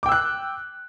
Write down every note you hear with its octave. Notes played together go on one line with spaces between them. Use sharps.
G5 D6 E6 F#6